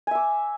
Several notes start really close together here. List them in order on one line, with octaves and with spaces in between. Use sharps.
G#5 E5 D6